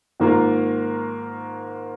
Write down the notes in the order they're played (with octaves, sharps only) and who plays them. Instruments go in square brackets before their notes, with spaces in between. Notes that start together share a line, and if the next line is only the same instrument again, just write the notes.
[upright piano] G#2 D#3 A#3 F4 A#4